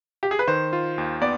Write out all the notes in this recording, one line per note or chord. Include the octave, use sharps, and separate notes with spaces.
G4
G#4
B4
D#3 C5
F4
D#2
B3 D5